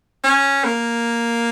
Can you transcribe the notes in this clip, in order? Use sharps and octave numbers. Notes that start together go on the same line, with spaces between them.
C#4
A#3